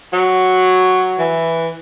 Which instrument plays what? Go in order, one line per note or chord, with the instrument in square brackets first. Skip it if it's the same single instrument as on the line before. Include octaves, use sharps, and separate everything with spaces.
[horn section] F#3
E3